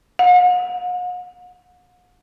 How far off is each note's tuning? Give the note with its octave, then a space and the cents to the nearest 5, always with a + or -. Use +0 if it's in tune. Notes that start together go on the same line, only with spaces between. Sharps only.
F#5 -45